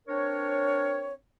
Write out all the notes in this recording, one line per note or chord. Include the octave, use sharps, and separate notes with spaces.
C4 D4 A#4 C#5